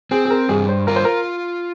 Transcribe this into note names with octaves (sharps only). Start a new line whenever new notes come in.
C4 G#4
G#4
A#4
G2 G#4
C5
F4 A#4
C5
A#4